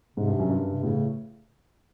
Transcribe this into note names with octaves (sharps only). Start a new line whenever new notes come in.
G#2 C3
G2
F#2
G2
C3
A2 C#3